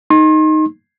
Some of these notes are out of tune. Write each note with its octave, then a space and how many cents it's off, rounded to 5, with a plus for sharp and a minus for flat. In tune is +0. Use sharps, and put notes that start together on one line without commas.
D#4 +0 C6 +40